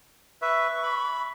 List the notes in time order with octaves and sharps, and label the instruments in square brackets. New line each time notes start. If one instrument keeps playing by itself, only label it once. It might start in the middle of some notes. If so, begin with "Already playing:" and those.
[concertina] B4 E5 [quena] C#6
[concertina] B5